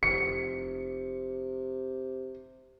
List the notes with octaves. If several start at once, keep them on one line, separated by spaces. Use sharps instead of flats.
F1 C3 C#7